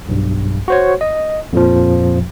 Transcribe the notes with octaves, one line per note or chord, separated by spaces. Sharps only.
B1 G2
F#4 C5 C#5
D#5
F2 A#2 F3